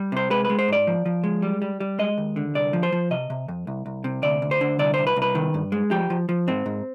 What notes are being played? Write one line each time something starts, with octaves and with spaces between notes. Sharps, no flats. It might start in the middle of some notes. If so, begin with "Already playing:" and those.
Already playing: G3
C3 C5
G#3 B4
G#3 B4
C5
G#2 D5
F3
F3
G#3
G3
G3
G3
G#3 D#5
D#2
D3
C2 D5
F3
C5
F3
C3 D#5
C3
F2
C2
C2
C3
D2 D5
D2
C5
D3
C2 D5
C2 C5
B4
C2
B4
D#3
G2
G#3
F3 G4
F3
F3
G#2 C4
G#2